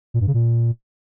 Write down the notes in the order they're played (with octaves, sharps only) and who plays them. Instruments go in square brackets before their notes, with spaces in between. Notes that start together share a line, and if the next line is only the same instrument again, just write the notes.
[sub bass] A#2
G2
C#3
A#2